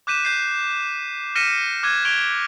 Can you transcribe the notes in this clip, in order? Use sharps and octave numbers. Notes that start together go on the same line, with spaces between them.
D6 F#6 G6 B6 D#7 E7
G6 C7
F6 A#6 B6 C#7 D#7 E7
D6 F6 F#6 G#6 D#7
C#6 G#6 D7 E7 F7 G7